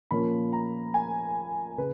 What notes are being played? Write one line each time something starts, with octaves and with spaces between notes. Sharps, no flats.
A#2 F3 A#3 C#4 B5
A#5
G#5
C#3 B4